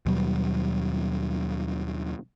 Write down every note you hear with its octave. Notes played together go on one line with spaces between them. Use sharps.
D#2 B2 F#3 G3